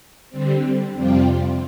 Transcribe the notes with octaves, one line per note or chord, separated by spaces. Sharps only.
D3 G3 C4
F2 C3 G3 C4 F4